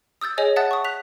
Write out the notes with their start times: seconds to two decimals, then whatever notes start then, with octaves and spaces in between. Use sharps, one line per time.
0.21 D#6 E6 G6 A6
0.38 G#4 C#5 D#5 G#5
0.56 E5 F#5 A5 D#6 F#6 A6
0.71 C#6 D#6
0.85 F#6 B6 F7